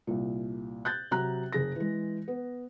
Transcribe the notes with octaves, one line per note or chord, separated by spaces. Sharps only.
C2 A#2
F#6 G6 A6
C3 F#3 A#5 F#6
F#1 G#4 A#6
E3 G#3
B3